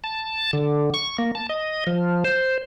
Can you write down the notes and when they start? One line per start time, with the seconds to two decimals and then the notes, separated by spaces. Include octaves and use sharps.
0.04 A5
0.53 D3
0.94 C#6
1.18 A#3
1.35 A5
1.49 D#5
1.87 F3
2.25 C5